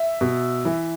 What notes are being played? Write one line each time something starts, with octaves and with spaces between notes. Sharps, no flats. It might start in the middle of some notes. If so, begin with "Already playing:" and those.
Already playing: E5
B2
E3